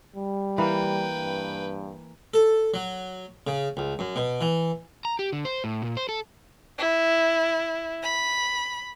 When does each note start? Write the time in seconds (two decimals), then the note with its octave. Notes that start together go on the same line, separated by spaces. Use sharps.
0.16 G3
0.58 E3 A#3 B4 G5
1.17 G2
2.34 A4
2.74 F#3
3.47 C#3
3.77 C#2
3.99 F#2
4.16 B2
4.41 E3
5.05 A#5
5.19 G4
5.33 D3
5.45 C5
5.64 A2
5.82 A#2
5.97 C5
6.09 A4
6.78 E4
8.03 B5